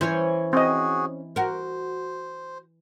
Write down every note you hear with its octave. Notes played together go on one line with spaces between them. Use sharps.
E3 C#4 C5 C#5
C4 F#4 G#4 D#5
F#4 A#4 C5